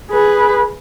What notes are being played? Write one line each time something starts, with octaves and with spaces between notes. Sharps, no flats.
G#4 B4